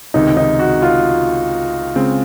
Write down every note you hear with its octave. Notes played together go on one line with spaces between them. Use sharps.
C#2 C3 D#3 D#4
D#4
F#4
F4
C#3 G#3 C4